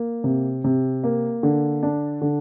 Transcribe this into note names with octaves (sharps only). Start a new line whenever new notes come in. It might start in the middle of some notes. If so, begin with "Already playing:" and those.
Already playing: A#3
C3
C3
A#3
D3
D4
D3